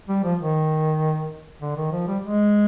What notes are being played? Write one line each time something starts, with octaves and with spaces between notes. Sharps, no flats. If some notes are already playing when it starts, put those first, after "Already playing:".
G3
F3
D#3
D3
D#3
F3
G3
G#3